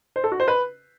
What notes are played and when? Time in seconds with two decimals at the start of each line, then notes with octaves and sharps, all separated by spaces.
0.16 C5
0.24 A4
0.32 F#4
0.40 C5
0.48 B4